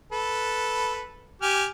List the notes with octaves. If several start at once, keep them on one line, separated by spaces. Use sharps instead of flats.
A4 B4
G4 G#5 F6